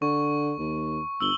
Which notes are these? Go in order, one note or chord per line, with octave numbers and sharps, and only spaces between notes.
D3 C#6
D#2
G1 E6 F#7 G7